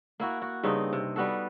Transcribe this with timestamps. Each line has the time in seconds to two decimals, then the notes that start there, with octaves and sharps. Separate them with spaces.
0.20 A#3 E4 F#4
0.42 F#4
0.63 G2 C#3 C4 D#4
0.93 C3
1.16 G3 B3 F#4 A4